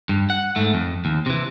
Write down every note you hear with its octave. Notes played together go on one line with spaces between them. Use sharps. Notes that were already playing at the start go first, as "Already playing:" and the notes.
G2
F#5
G#2 A3
F2
D#2
C3 E3